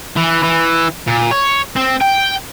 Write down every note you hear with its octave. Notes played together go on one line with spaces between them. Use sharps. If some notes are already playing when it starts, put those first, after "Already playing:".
E3
E3
A#2
C#5
C4
G5